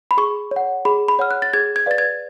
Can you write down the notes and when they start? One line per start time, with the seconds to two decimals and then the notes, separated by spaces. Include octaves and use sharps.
0.11 B5
0.17 G#4 C#6
0.51 C#5
0.56 F#5
0.85 G#4 B5
1.08 B5
1.19 C#5 F#5 F6
1.31 F#6
1.42 A6
1.53 G#4 G#6
1.76 G#6
1.86 B4 D5 F5 A6
1.98 G#6